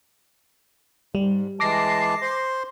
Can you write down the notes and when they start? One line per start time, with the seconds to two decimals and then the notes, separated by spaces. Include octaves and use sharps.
1.15 G#2 G3
1.60 E3 G#3 A5 D6 A#6 C7
2.22 C5 C6